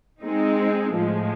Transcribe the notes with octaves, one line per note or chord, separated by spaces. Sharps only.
G#3 C4 D#4
A2 F3 G#3